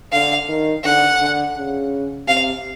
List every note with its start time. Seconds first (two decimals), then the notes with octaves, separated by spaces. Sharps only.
0.12 D3 F5
0.49 D#3
0.84 D3 F#5
1.20 D3
1.56 C#3
2.27 C3 F5